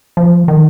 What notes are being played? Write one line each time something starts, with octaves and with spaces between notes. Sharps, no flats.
F3
D#3